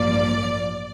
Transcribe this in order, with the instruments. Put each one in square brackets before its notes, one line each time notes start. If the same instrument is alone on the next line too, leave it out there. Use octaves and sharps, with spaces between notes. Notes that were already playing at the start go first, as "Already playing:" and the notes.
Already playing: [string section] A1 G2 F3 A#3 D5